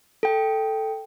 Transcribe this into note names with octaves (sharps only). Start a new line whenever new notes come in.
A4 G5